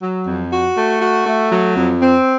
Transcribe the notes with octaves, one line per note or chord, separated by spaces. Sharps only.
F#3
F2
F#4
A3
F#4
A3
F#3
F2
C4